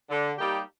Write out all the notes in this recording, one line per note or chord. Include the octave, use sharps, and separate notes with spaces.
D3
G3 A#3 D#4 G4